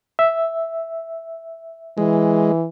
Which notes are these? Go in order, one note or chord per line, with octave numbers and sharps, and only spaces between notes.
E5
E3 G#3